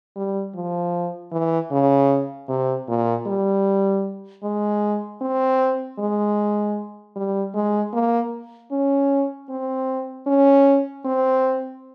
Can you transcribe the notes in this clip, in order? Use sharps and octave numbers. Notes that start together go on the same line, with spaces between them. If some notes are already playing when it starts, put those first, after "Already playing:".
G3
F3
E3
C#3
C3
A#2
G3
G#3
C4
G#3
G3
G#3
A#3
C#4
C4
C#4
C4